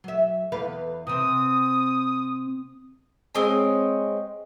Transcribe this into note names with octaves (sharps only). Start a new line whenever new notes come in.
F#3 E5
E2 B4 F5
C3 C4 D#6
G#3 C4 C#5 G#5